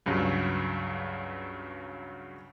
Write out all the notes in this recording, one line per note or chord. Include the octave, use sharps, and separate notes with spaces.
C#2 G2 C#3 F#3